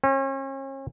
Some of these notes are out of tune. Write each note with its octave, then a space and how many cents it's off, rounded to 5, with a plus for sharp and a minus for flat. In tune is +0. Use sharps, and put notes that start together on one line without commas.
C#4 -40